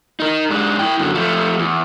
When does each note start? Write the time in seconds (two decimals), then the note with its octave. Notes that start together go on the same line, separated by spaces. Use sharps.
0.20 D#4 A#4
0.50 G#2 D4
0.79 E4 G5
0.99 F#2 D3
1.15 F3 A3
1.59 E2